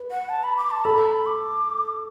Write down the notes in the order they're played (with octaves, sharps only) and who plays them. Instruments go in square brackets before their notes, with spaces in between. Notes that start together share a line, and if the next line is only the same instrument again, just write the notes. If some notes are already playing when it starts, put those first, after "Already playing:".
Already playing: [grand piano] B4
[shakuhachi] F#5
A5
B5
D6
A5
[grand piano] A4 [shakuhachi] B5
[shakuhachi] A5
B5
D6